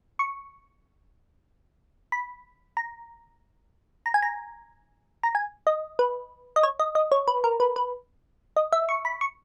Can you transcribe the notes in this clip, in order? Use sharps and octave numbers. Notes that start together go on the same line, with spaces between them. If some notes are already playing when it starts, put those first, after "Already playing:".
C#6
B5
A#5
A#5
G#5
A#5
A#5
G#5
D#5
B4
D#5
C#5
D#5
D#5
C#5
B4
A#4
B4
B4
D#5
E5
C#6
B5
C#6